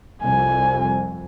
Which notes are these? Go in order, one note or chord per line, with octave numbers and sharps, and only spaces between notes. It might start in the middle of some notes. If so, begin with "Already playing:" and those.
C2 F2 G#5